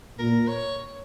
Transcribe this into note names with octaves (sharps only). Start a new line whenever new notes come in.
A#2 A#4
C#5